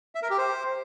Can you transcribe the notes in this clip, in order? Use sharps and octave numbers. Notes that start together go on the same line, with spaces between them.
E5
A#4
G4
C5